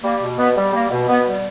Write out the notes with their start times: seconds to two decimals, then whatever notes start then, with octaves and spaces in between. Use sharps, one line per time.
0.04 G3 A#3
0.21 B2
0.38 B2 B3
0.56 G3
0.73 G3 A#3
0.91 B2
1.08 B2 B3
1.26 G3